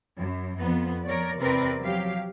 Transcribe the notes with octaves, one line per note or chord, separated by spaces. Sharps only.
F#2
F2 B3
F3 A#4 C#5 D5
E2 C3 C4 A#4 B4 D5
F3 F#3 G4 F5